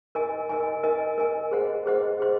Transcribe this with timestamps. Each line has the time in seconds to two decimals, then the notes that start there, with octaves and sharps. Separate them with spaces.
0.15 A#4 D#5 G#5
0.49 A#4 D#5 G#5
0.83 A#4 D#5 G#5
1.18 A#4 D#5 G#5
1.51 G#4 C5 D#5 F#5
1.86 G#4 C5 D#5 F#5
2.20 G#4 C5 D#5